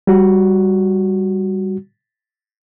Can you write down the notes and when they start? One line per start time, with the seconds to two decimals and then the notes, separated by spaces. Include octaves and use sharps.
0.07 G3 F#4